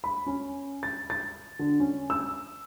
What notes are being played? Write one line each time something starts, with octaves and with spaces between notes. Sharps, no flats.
B5
C#4
A6
A6
D3
C#4
E6